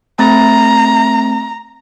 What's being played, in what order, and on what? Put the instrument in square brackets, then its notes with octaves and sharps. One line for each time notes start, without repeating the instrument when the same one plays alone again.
[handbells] A3 C4 A6 [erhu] A#5